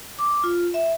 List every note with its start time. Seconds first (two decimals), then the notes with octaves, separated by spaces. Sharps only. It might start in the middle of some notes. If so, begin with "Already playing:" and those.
0.19 D6
0.44 F4
0.74 E5